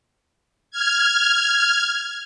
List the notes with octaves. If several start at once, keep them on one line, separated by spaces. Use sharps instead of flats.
F6 G#6